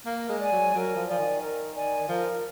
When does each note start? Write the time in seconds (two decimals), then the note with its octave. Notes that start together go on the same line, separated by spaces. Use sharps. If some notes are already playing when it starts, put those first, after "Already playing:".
0.06 A#3 A#4
0.29 G#3
0.40 D5 G#5
0.52 F#3
0.74 F#3 A#4
0.96 F3
1.07 F3 D5 G#5
1.19 D#3
1.41 A#4
1.75 D5 G#5
2.08 F3 A#4